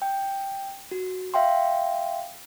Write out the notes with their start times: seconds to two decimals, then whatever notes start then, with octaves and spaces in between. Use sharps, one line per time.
0.02 G5
0.91 F#4
1.34 E5 F5 G5 C6